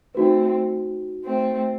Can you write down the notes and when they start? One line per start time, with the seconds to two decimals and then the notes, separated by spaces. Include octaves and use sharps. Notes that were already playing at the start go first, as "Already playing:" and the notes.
0.15 A3 C4 D#4 F#4 B4
1.24 A3 C4